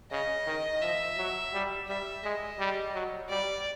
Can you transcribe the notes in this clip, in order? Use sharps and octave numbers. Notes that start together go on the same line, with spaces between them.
C#3 D#5
D#3
F3 E5
F#3
G3
G3 E5
G#3 D#5
G3
F#3
G3 D5